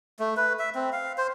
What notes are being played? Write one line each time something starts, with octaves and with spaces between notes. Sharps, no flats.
A3
B4
E5
C4
F5
C5